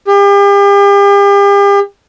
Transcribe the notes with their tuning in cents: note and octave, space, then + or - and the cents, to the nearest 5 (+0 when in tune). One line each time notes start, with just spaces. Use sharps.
G4 +40